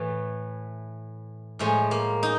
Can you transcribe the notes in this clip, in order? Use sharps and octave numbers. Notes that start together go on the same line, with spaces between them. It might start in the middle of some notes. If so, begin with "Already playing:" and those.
Already playing: A2 E3 A3
A2 F3 G#3 A3
A#3
D#4